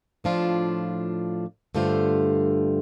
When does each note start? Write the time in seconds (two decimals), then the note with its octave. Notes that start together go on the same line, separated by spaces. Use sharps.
0.24 A2 F3 D4 F4
1.75 G2 D3 A3 F4 C5